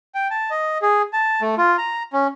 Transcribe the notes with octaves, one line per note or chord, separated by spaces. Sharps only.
G5
A5
D#5
G#4
A5
A3
F4
A#5
C#4